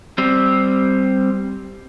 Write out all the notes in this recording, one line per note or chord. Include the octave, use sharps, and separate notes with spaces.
G3 C4